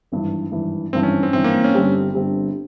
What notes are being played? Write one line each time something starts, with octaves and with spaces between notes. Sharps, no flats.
G#1 G2 E3
G#1 G2 E3
G#1 G2 E3 C4
C#4
C4
G#1 G2 E3 C4
A#3
C#4
G1 G2 G3 C4 G4
G1 G2 G3 C4 G4